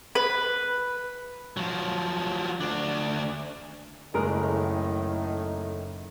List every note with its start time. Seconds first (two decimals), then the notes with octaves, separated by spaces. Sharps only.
0.15 B4
1.57 F3 F#3
2.60 D2 D4
4.14 F#1 A2 D#3 G#3 A#4